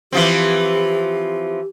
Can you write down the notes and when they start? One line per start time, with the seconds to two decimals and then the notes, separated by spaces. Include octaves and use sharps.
0.12 E3 F3 C4 G4